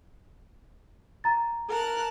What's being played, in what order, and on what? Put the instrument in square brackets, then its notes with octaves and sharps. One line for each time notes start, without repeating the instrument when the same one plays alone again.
[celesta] A#5 A6
[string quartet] A#4 A5 F#6